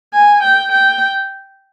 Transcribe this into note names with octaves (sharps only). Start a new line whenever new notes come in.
G#5
G5
G5